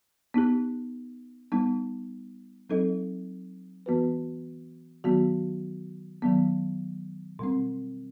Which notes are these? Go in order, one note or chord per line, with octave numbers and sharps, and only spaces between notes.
B3 D#4 G4
G3 B3 D#4
F#3 C4 D#4 A4 D#5
E3 B3 F#4 B4
D#3 F#3 B3 F#4
D#3 F#3 B3
B2 G3 C4